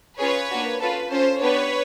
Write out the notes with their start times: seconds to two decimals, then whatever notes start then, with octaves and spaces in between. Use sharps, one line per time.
0.19 C#4 F4 G#4 B4 C#5
0.49 A#3 D4 F#4
0.81 C#4 F4 A4 B4
1.11 C#4 F4 A4 C5
1.41 B3 D4 G4 B4 C#5